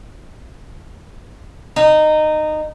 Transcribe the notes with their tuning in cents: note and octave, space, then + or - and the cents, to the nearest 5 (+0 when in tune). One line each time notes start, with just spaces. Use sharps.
D#4 -15